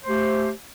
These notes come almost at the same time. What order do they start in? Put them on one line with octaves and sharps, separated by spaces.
C5 A3 G4